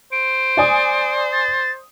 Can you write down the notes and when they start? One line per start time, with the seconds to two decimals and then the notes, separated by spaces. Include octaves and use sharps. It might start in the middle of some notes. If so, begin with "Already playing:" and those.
0.12 C5 D7
0.57 D5 G#5 D#6
1.33 A6